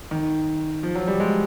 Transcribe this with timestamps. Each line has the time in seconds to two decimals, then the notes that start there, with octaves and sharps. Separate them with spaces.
0.11 D#3
0.83 F3
0.95 F#3
1.07 G3
1.20 G#3